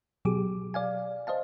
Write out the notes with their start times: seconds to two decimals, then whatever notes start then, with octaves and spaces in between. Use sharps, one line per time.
0.25 B2 F#3 G4 G#4 D6
0.74 D5 F5 G#5
1.27 C5 D#5 F5 A5